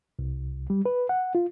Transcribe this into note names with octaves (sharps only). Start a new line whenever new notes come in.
C2
G3
B4
F#5
F4